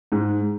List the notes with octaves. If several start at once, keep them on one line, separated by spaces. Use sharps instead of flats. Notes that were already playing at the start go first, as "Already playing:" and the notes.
G#2